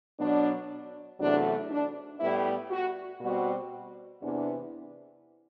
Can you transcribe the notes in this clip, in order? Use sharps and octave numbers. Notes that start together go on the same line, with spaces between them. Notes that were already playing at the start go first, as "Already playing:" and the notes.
B2 F#3 B3 D4
E2 C3 F#3 A3 D4
D4
A2 G3 B3 E4
F#4
B2 G3 C4 F#4
E2 C3 E3 B3 D4